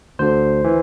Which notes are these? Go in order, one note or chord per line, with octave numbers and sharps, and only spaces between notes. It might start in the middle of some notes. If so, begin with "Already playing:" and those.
D2 D3 C5
E3